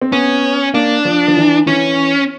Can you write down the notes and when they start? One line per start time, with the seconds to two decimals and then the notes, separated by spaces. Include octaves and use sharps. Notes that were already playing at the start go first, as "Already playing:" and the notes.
0.02 C4
0.12 B3 C#4
0.74 A#3 D4
1.05 F3
1.28 F3
1.37 E3
1.67 E3 C#4